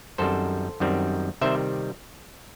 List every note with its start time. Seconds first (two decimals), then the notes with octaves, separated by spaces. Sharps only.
0.18 F#2 D#3 G3 C4 A4 C5
0.80 F#2 D#3 G3 C4
1.41 C3 D#3 G3 C4 C5 E5